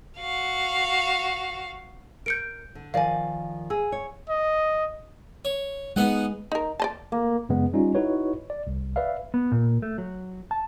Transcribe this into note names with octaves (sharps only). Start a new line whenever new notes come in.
F#4 F5
A#4 G6 C#7 D7
D3
D#3 F3 D5 F5 G#5
G#4 G#5 E6
C#5
D#5
C#5
G#3 B3 D#4 F#5
D#4 A#4
D5 D#5 A5
A#3
F#2 C#3 G#3 B3
G3 C#4 D#4 F4
D#4 E4 F#4 B4 C#5
D5
C2
B4 D5 E5 F5
B3
A#2
A3
F#3
A5